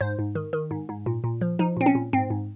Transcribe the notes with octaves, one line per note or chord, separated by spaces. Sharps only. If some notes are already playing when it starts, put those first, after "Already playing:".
G#2 C5
G#2
D#3
D#3
G#2
G#2
A#2
A#2
F3
F3 D#4
A#2 C4
C#4
A#2
G#2 C4
G#2